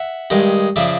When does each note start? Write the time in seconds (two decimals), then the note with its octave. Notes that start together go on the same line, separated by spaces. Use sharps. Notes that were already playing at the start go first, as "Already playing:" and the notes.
Already playing: E5 F#5
0.30 G2 D#3 G#3
0.76 C#3 F3 D5 E5